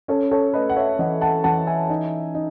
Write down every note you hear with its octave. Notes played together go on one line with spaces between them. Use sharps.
C#4 A4 C#5
A4 C#5
A3 B4 D#5
F#5
C#5 E5
E3 D#5 F#5
F#5 A5
E3 F#5 A5
E5 G#5
D#4
D#4